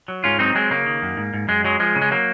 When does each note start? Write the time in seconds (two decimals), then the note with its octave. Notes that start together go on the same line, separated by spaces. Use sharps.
0.08 F#3
0.24 G#2 C#4 F4
0.39 F#3 C4 D#4
0.55 F#3 G#3 C4
0.71 C#3 A#3
0.86 D#3
1.02 F#2
1.17 G#2
1.34 G#2
1.48 F#2 G#3
1.64 F#3 G#3
1.80 F3 G#3
1.95 C#3
2.02 G#3
2.11 F#3 A#3